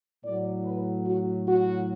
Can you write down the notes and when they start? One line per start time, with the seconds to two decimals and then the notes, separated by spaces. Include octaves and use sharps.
0.24 A2 F#3 D5
0.65 B4
1.07 F#4
1.48 F#4